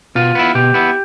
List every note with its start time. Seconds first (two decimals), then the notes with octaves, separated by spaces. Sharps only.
0.15 B2 F4
0.35 B3 E4
0.55 B2 G4
0.74 B3 E4